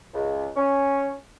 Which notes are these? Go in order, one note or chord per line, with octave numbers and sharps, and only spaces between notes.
C#2
C#4